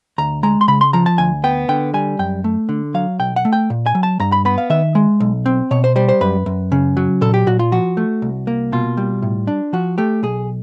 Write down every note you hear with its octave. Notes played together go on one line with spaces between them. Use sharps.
D2 A#5
G#3 A#5
C6
C#3 B5
C6
F3 A#5
A5
D2 G#5
B3 G5
D3 G5
G3 G#5
F#2 G5
A3
D3
F#3 F5
B1 G5
F#5
A3
G5
A#2
G#5
F#3
A5
G2 A#5
B5
B3 B5
F5
D#3 E5
G#3
B1
C4
B2 C#5
C5
G3 C5
C5
F#2 B4
F#2
C#3
F#3
A#2 A4
G4
A#2 F#4
F4
F3 F#4
A3
C2
A#3
B2 F4
G3
A2
D4
F3 F#4
A3 G4
B1 G#4